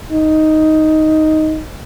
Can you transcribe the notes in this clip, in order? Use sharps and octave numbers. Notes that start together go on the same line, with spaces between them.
D#4